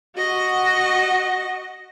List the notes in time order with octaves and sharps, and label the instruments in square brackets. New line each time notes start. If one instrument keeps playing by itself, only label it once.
[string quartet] F#4 D#5 F#5